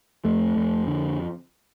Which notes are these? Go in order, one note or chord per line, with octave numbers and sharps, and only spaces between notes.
F2 A3
F2
D3